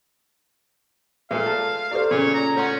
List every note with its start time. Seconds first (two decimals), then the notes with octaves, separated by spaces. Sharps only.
1.31 A#2 G#3 A3 G#4 B4 E5 F5
1.46 A5
1.91 E4 G4 A4 C5 D5
2.11 A#2 C#3 C#5 C6
2.34 A#5
2.56 A2 C#4 C#5 F#5 C6